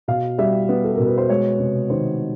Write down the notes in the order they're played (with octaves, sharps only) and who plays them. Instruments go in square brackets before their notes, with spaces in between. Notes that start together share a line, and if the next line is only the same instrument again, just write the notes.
[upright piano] B2 F5
G3 E5
B3
A4
B2 A#4
B4
C5
G#3 C#5
C3
D#3 C5